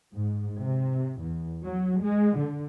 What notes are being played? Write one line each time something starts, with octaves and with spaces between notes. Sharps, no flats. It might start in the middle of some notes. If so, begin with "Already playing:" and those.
G#2
C3
E2
F#3
G#3
D3